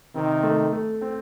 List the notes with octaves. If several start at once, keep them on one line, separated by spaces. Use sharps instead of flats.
C3 D#3 C4
A3
A3
C4